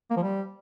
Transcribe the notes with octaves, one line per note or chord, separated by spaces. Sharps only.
A#3
F3
G3